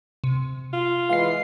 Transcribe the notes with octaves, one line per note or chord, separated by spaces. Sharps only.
C3
F4
E3 G#3 F5 C7